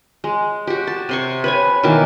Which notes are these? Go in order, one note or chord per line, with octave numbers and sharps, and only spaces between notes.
G#3
F#4 G4
A5
C3 C6 C#6
B4 C#5 G#5
B2 D#3 E3 A#3